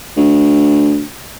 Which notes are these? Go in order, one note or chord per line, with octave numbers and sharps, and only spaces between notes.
D2